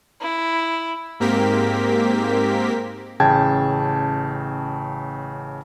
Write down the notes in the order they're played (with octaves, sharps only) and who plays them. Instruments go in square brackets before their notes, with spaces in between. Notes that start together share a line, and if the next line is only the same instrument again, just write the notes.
[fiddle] E4
[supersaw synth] G#2 A#3 C4 G4 A#4 B6
[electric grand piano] A1 C#3 G5 A5 G#6